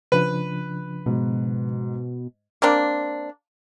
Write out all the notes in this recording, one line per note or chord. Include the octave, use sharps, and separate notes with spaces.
C#3 F3 D4 B4
G#2 B2
A#3 C4 D4